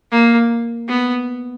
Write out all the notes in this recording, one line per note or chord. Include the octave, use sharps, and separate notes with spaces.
A#3
B3